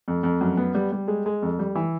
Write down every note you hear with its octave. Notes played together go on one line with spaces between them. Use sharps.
F2
F2
F#2
B3
G3
G3
G#3
G#3
F2
G3
E3